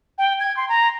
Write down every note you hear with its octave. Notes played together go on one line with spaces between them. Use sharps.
G5
G#6
C6
A#5